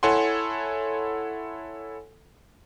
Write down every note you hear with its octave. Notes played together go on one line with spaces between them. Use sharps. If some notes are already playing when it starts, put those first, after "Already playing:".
E4 A4 C#5 F#5 G#5 C6